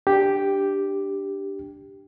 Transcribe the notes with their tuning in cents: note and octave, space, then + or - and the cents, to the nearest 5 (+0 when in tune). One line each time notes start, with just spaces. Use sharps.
D4 +0 G4 +0